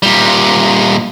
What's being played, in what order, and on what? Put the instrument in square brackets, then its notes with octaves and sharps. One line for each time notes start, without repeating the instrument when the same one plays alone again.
[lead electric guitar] A#2 G3